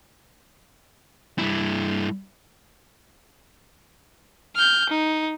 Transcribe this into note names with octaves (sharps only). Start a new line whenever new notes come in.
G2 E4
F6 G6
D#4